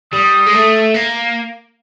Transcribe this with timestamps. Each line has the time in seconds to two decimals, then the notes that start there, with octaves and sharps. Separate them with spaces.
0.13 G3 D#6
0.46 G#3
0.53 A3
0.94 A#3